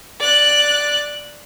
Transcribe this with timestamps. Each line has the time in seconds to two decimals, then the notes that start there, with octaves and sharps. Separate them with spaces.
0.20 D5 F#6